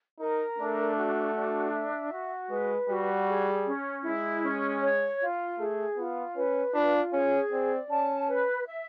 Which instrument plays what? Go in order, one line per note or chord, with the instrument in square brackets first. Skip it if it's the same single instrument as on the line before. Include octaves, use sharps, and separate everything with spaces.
[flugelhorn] D#4 [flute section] A#4
[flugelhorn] A3 [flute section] D4
[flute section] F#4
D4
E5
F#4
[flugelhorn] G#3 [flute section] B4
[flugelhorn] G3 [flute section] F#4
[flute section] G#4
C#4
[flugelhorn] G#3 [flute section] E4
[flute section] C#4
C#5
F4
[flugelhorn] A3 [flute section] G#4
[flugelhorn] B3 [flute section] F4
[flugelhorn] C#4 [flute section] B4
[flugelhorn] D4 [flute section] F4
[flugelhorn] C#4 [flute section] G#4
[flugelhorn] C4 [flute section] D5
[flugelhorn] C#4 [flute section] A5
[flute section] B4
E5